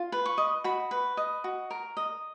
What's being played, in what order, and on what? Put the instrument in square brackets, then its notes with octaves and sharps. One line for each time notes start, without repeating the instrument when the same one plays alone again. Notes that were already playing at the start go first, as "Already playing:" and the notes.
Already playing: [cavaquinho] F4
B4
C#6
D#5
F#4 B5
B4
D#5
F#4
A#4
D#5